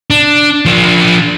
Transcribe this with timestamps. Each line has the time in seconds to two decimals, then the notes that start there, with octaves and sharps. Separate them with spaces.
0.10 D4
0.65 F3 D4